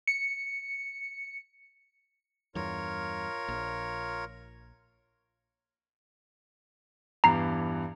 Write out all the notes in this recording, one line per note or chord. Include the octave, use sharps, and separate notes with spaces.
C#7
E2 G2 F4 A#4 C#5
A#1
E2 G2 E3 A#5 C7